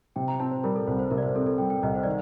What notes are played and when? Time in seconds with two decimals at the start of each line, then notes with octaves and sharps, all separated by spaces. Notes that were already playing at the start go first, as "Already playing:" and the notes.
0.16 C3 G5
0.28 A#5
0.40 C4 A5
0.51 C5
0.64 G3 A#4
0.76 A4
0.87 C2 C5
0.99 C5
1.11 C3 A#4
1.18 D5
1.23 C5
1.35 C4 A4
1.47 A4
1.58 G3 G5
1.70 G5
1.83 C2 D#5
1.95 C5
2.03 D#3 D5